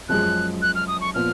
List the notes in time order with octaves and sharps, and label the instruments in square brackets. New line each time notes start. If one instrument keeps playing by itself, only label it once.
[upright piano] F#2 F3 G#3 [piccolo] F#6
[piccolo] F#6
F6
D#6
C#6
[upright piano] A#2 F3 B3 F4 [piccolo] F6